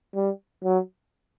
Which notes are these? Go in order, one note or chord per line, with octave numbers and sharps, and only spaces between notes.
G3
F#3